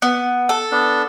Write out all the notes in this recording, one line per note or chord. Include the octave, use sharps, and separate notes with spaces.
B3
A4
B3 D4